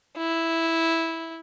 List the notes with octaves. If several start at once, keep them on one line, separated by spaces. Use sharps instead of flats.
E4